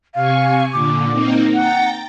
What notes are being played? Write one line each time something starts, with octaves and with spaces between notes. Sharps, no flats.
C3 F5 G#5 C#6
A#2 D3 D6
A#3 C4 D#4
F#5 G5 A#5 A6